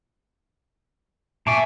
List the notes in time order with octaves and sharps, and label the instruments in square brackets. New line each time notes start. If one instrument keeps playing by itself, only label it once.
[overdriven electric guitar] A#2 G#5 [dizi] E5 [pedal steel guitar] A5 C#6 [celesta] D6 C7 D7